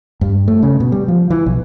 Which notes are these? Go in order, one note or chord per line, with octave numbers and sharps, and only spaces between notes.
G2
A3
C#3
B2
G3
F3
E3
B1